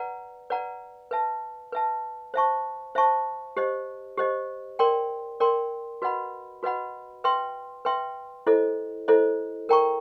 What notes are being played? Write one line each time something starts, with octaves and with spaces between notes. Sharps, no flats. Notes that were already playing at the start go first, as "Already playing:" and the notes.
Already playing: B4 D5 F#5 A#5
B4 D5 F#5 A#5
B4 E5 A5
B4 E5 A5
C5 E5 A5 C#6
C5 E5 A5 C#6
G4 C5 D#5
G4 C5 D#5
A#4 D5 G5 C6
A#4 D5 G5 C6
F#4 B4 D#5 F#5 B5
F#4 B4 D#5 F#5 B5
B4 E5 G5 C6
B4 E5 G5 C6
E4 A4 C5 D#5
E4 A4 C5 D#5
A#4 D5 G5 A#5 C#6